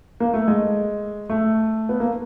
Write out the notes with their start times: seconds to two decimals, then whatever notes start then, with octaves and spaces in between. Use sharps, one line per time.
0.20 A#3
0.34 A3
0.48 G#3
1.30 A3
1.89 B3
2.00 A#3